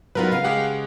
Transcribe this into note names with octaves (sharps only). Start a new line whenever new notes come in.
F#3 B3 D#4 F4 A#4 B4
C#3 F5
G#3 G4 F#5